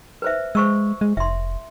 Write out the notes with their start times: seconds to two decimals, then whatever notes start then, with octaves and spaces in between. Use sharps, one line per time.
0.22 B4 C5 E5
0.55 G#3 C5 C#6 E6
1.01 G#3
1.17 F1 E5 C6